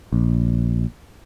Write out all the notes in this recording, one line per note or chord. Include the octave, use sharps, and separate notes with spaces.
A#1